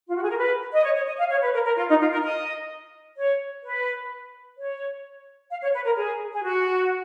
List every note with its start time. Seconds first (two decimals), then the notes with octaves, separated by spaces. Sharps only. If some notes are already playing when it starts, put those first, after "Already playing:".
0.08 F4
0.16 F#4
0.23 G#4
0.30 A#4
0.37 B4
0.73 D#5
0.84 C#5
0.95 C#5
1.07 D#5
1.19 F5
1.30 C#5
1.42 B4
1.53 A#4
1.65 A#4
1.77 F4
1.89 D#4
2.01 F4
2.12 A#4
2.24 D#5
3.17 C#5
3.63 B4
4.57 C#5
5.50 F5
5.62 C#5
5.74 B4
5.85 A#4
5.97 G#4
6.32 G#4
6.43 F#4